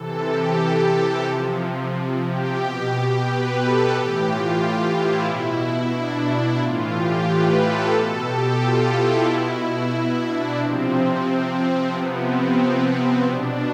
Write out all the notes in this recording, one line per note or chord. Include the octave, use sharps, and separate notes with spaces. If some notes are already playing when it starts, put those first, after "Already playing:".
Already playing: C3 E3 A4
G4
C3 F3
G4
B2
G4
B4
A4
A2 E3 G4
F4
E4
B2 E4
D4
E4
A2 E3 F4
G4
B4
A4
B2 A4
G4
F4
E4
B2
E4
D4
C3 F3 C4
C4
C4
C3 F3 B3
C4
B2 D4